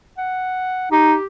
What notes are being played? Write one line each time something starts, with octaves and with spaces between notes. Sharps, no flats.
F#5
D#4 G4